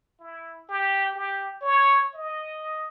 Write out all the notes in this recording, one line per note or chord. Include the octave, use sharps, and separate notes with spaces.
E4
G4
G4
C#5
D#5